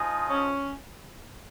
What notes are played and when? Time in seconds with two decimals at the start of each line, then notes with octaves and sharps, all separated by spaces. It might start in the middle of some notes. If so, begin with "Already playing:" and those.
Already playing: F3 G#3 D#4 G#4
0.30 C#4